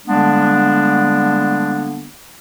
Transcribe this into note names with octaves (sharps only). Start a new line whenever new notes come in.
D3 G3 G#3 A#3 B3 D4